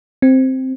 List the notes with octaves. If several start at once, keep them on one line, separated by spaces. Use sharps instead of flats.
C4